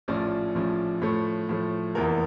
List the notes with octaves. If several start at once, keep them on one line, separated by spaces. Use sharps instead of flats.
A#1 A2 F3 C#4 D5
A#1 A2 F3 C#4
A2 F3 A3 C#5
A2 F3 A3
F1 E2 E3 A#3 A#4